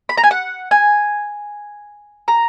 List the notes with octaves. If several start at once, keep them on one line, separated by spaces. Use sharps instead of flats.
B5
A#5
G#5
F#5
G#5
A#5